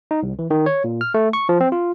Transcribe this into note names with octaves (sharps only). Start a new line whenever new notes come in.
D#4
C2
E3
D#3
C#5
A#2
F6
A3
C#6
F3
C4
F4